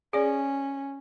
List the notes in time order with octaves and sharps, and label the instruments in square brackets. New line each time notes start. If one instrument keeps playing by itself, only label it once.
[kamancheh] C#4 [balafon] G#4 D5